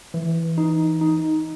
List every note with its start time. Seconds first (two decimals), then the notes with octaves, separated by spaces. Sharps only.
0.14 E3
0.58 D#4
1.01 D#4